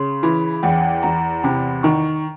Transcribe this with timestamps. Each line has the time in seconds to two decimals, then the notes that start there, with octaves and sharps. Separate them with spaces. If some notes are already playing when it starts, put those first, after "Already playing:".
Already playing: C#3 C6
0.23 E3 B5
0.63 E2 G5
1.03 E2 A#5
1.44 C3 B5
1.83 D#3 C#6